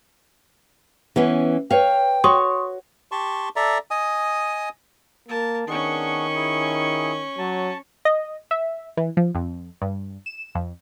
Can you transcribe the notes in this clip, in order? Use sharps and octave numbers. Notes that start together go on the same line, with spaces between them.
E3 B3 C#4
B4 C#5 F5 G5
F#4 C#5 C6 C#6 D#6
G4 A5 C6 C#6
A4 D5 E5 A#5
D#5 G#5 D#6
A#3 A#4 A5
D#3 B3 C#4 D4 G#4 C#6
E4 G#4
F#3 A5
D#5
E5
E3
F3
F2
G2
E7
F2